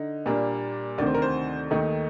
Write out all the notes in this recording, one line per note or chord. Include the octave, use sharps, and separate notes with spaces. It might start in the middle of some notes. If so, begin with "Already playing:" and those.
Already playing: D3 D#4
A#2 G3 A#3 D4
D2 C3 D#3 D5
C5
A#4
C5
D#2 D#3 A3 D#4